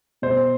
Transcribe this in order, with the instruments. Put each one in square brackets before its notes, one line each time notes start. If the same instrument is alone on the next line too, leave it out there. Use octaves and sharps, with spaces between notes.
[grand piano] B2 C5